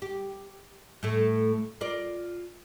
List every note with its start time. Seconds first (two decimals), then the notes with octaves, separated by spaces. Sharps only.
0.02 G4
1.03 A2 A3
1.81 F4 A#4 D5